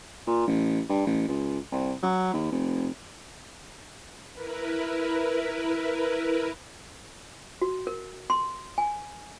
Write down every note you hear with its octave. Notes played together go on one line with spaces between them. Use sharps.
A#2
A1
G2
A1
C#2
C2
F#3
D#2
F1
E4 A#4 B4
F#4
A#4
C6
G#5